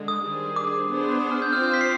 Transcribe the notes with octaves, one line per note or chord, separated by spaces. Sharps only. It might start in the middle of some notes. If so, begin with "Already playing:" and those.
Already playing: D3 G#3
D#6
D#3 G3 D4 G#4 C5
D6
B3 D4 G#4 C5
D#6
F6
G6
C4 F4 C5 F6
G6
B6
C7